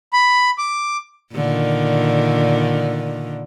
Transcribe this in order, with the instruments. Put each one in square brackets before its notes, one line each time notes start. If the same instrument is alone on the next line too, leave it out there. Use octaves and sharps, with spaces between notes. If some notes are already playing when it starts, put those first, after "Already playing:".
[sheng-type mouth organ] B5
D6
[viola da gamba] A#2 D3 D#3